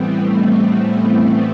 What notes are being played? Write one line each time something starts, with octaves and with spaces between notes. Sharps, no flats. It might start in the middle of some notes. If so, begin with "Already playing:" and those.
Already playing: A2 E3 G3 B3 C4
A3
B3